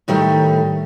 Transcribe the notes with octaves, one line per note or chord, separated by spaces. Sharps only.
A2 D#3 G3 A3